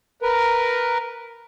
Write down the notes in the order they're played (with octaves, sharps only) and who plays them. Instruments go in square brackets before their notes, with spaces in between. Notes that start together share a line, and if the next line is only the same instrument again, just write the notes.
[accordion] A#4 B4